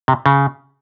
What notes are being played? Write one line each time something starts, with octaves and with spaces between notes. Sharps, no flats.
C3
C#3